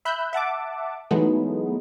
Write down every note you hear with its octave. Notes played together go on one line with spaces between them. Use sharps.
E5 B5 E6 F#6 G6
E5 F#5 A5 D6
E3 F#3 G#3 A3 B3 D#4